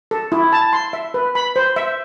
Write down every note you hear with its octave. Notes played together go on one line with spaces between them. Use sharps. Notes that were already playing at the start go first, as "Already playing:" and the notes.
A4
E4
A5
C6
E5
B4
B5
C5
E5